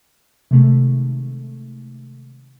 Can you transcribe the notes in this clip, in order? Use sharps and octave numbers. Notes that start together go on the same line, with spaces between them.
C3 D#3 G#3 A3